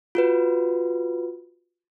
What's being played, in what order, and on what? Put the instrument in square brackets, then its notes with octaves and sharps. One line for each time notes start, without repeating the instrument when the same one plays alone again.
[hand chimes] F4 F#4 B4